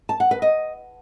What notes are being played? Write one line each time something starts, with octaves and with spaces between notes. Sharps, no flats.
A5
F#5
B4
D#5